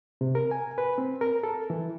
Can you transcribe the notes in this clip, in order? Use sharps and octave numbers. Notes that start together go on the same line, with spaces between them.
C3
A#4
G#5
B4
C4
A#4
A4
E3